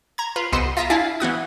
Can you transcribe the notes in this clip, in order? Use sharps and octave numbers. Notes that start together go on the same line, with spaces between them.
A#5 G#6
F4 B4
C2 B3 C5 D#5 E6
F4 E5 A#5 D#6
D4 E4 F5 G#5 A5 B5
E3 B3 F#4 D#6